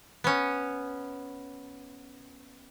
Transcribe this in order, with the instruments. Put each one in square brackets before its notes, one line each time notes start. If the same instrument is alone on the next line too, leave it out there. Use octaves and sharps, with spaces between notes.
[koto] B3 C#4